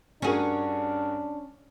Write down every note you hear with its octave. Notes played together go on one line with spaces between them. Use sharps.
G2 C#4 D4 F#4 G#4 A#4